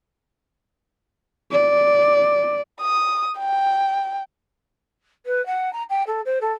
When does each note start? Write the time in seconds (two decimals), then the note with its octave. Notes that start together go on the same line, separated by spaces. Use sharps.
1.52 D5
2.81 D#6
3.38 G5
5.26 B4
5.46 F#5
5.73 A#5
5.89 G5
6.07 A4
6.25 C5
6.41 A4